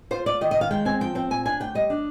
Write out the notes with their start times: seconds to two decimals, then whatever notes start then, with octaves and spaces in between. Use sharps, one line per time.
0.11 F4 C5
0.26 F4 D5
0.41 D#3 D#5
0.51 D#5
0.56 D#3 F5
0.71 G#3 G5
0.85 C4 G#5
1.00 F3 G5
1.15 C4 G5
1.30 A#2 G#5
1.45 D4 G#5
1.60 D2 G5
1.75 G3 D#5
1.90 D4